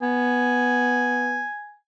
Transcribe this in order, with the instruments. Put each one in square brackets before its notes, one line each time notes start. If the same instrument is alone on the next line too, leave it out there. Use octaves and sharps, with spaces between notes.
[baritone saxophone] B3 [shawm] G#5